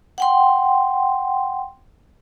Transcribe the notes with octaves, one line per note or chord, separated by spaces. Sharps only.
F#5 G5 C6